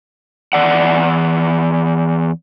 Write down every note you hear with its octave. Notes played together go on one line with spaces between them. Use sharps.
E2 A3 D5 F#5